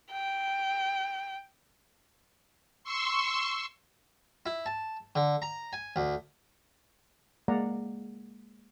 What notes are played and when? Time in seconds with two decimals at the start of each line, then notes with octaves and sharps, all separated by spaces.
0.12 G5
2.84 C6 C#6 E6
4.46 E4
4.66 A5
5.16 D3
5.42 A#5
5.73 G#5
5.96 D2
7.48 G#3 A#3 D5 F5 F#5 A#5